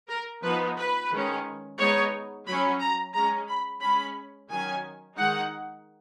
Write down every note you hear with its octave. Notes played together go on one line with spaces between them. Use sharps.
A#4
F3 B3 D#4 B4
B4
D#3 G#3 C#4
G#3 B3 D#4 C#5
F#3 C#4 B5
A#5
G#3 C#4 A#5
B5
G#3 C#4 B5
D#3 F#3 C#4 G#5
D#3 G#3 D#4 F#5